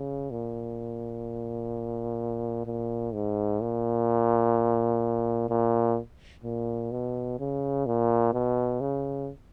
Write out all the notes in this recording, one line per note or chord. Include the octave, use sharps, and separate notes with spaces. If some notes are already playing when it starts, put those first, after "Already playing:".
Already playing: C#3
A#2
A#2
G#2
A#2
A#2
A#2
B2
C#3
A#2
B2
C#3